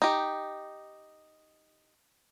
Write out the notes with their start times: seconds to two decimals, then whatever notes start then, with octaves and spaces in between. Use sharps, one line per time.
0.02 D#4 G4